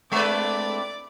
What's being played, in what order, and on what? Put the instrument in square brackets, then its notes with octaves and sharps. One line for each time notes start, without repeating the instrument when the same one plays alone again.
[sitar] G#3 A3 B4 [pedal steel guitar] C4 D4 E4 [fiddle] D5 D6